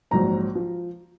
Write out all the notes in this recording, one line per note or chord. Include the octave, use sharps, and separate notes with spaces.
A#1 G#2 F#3 A#5
F3